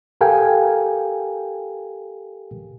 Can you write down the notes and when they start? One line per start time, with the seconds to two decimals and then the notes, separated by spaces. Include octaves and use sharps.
0.21 G4 A4 A#4 F5 G5 G#5